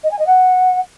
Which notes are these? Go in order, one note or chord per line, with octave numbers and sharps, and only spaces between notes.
D#5
G#5
D#5
F#5